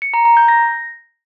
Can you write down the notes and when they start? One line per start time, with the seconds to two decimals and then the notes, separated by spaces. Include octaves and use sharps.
0.02 C#7
0.14 A#5
0.25 A#5
0.37 G6
0.48 A#6